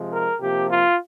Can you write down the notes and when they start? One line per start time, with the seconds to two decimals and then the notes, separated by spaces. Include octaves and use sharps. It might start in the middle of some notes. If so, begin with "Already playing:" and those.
Already playing: C3 F3 G#3
0.11 A#4
0.40 C3 F3 A#3 G4
0.69 F4